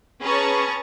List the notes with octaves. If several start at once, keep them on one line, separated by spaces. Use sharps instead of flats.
C#4 G#4 B4 A5 A#5 C#6